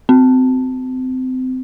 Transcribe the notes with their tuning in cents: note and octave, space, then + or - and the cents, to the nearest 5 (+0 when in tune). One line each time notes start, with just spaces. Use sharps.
C4 -25